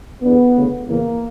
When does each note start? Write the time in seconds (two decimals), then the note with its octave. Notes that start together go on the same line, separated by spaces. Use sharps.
0.23 E2 D3 B3
0.56 D2 C#3 E3
0.87 E2 C#3 E3 A#3